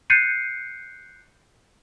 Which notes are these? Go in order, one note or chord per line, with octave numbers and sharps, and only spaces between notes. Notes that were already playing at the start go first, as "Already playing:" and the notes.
F#6 G6 A6 C7 C#7 D#7